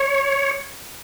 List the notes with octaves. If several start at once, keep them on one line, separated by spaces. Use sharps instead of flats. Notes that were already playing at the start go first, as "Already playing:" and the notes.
Already playing: C#5